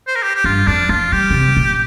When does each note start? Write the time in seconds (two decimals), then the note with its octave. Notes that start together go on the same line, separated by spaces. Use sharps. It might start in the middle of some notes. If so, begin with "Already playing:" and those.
0.07 C5
0.15 A#4
0.22 G4
0.35 G4
0.44 G2 F4
0.67 F2 D4
0.89 F3 F4
1.12 G3 G4
1.30 D3
1.34 C3
1.57 A#2